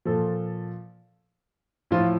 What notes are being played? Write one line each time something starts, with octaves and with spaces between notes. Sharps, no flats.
A#2 F3 A4
A2 F3 F4